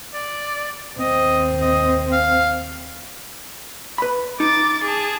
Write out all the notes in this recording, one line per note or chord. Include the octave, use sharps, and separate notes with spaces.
D5
D#2 C4 D#5
D#5
F5
B4 B5
D#4 D6 A6
G#4 A5